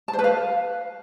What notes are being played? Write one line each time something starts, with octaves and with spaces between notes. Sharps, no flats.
A5
C5
B4
F5